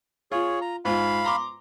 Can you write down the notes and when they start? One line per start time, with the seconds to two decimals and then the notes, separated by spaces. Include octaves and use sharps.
0.32 F4 G#4 C#5
0.61 A#5
0.85 G#2 F4 F5 B5
1.25 A#5 C6 D6